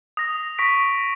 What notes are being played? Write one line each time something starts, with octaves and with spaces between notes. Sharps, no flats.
D#6 A#6
C#6 A#6 B6 D7